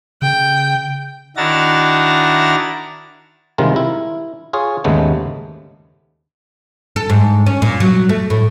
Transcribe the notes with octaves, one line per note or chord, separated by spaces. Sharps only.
C#3 G5
D#3 D4 E4 F#4 A#5 A6
C3 D#3 G3 G#3 F4 A#4
E4
F4 G#4 C#5
D#2 G#2 C#3 G#3 A3 B3
A4
G#2
C#4
A#2
F#3
A3
A2